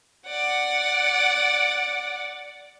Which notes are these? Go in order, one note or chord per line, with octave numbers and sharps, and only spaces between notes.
D5 F#5